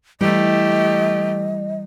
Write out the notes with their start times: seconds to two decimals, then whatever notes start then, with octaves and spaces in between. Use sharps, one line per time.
0.21 E3 G3 A3 G4 D#5